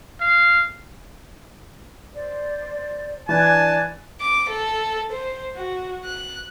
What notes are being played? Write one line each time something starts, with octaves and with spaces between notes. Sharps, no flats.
F5
C5 D5
E3 D4 D5 G#5 A5 F#6
D6
A4
C5
F#4
F#6